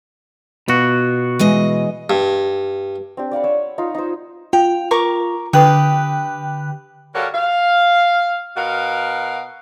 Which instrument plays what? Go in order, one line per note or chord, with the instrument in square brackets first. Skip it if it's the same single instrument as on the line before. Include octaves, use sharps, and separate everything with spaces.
[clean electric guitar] B2 F#4 [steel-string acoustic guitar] F4
[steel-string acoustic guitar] E3 G#3 D#5
[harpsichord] G2
[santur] C4 D4 G4
D5 F5 F#5 B5
C#5 D6 E6
D#4 F4
D#4 C5
[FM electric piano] F4 [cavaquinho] G5
[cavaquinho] A#4 C#6 D6
[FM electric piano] D3 G5 F#6 [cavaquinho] G4 B4 D#6
[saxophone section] G3 F#4 A4 A#4 C#5 F5
F5
B2 F#4 A#4 F5